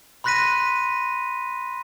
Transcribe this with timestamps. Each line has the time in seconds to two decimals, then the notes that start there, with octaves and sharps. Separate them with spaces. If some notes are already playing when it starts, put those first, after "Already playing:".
0.24 B5 C6 F#6 A#6 B6 D#7